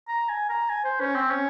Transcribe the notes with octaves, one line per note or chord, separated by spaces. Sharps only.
A#5
G#5
A#5
G#5
C5
C#4
C4
C#4